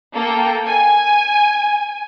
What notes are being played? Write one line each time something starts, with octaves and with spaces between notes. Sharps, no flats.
A#3 A4 G5
G#5